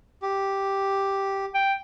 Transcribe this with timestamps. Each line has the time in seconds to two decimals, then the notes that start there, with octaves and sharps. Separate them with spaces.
0.22 G4
1.54 G5